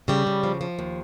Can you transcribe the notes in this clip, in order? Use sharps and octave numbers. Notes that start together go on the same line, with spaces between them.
C#3 G3
C#3
F3
F3
D#2